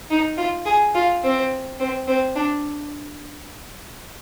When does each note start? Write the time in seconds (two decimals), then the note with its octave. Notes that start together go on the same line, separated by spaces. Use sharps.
0.10 D#4
0.38 F4
0.66 G#4
0.95 F4
1.23 C4
1.80 C4
2.07 C4
2.36 D4